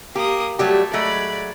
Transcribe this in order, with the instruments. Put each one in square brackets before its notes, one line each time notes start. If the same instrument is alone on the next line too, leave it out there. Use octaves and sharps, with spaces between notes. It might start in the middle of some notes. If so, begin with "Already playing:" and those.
[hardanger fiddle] A#3 D#6 [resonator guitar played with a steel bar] G4
[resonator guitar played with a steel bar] F#3 G3 G4 [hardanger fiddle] A3
[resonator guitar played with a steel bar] F#3 G#3 A3 [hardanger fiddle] D5 B5